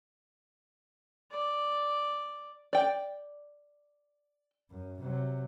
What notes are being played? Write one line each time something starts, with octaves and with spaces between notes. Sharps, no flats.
D5
D5 G5
F#2
C3 F#3